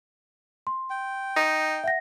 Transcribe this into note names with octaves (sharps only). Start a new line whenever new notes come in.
C6
G5
D#4
E5 F#5 A#6